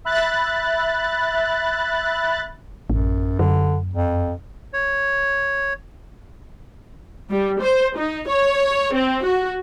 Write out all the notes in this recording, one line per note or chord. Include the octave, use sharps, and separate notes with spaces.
E5 B5 F#6 A6
A1 F#2
F#2 D3
F2
C#5
G3
C5
D#4
C#5
C4
F#4